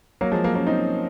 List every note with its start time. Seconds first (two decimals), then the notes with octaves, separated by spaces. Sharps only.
0.21 F#3 A#3
0.32 F3 G#3
0.44 F#3 A#3
0.55 A#3 C#4
0.67 C4 D#4